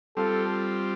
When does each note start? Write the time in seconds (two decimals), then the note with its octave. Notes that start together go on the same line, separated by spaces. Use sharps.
0.17 G3 C4 F4 A4